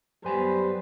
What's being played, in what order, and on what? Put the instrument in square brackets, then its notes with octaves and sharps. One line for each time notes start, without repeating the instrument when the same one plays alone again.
[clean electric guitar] F#2 G#5 B5 [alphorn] G3 [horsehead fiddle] B3 B4 [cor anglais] C5